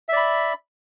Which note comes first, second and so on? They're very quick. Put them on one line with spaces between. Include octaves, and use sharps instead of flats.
E5 D5 B5